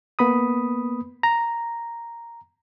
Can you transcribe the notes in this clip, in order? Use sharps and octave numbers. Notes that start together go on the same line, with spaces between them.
A#3 B3 B5 D#6
A#5